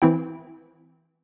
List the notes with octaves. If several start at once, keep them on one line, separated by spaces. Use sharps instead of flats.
E3 C4 E4 G5